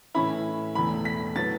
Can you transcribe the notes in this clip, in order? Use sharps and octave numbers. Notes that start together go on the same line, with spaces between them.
A2 E3 C#4 E4 B5
E1 E2 E3 A3 B5
B6
A2 F#3 B3 A6